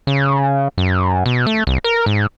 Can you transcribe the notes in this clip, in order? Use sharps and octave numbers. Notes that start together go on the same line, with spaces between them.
C#3
F#2
B2
A3
C2
A#4
G#2